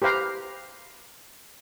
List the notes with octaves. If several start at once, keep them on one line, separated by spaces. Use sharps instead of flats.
G4 B4 C5 F5 A#5